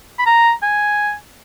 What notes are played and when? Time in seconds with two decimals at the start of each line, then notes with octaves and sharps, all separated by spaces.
0.19 B5
0.26 A#5
0.63 G#5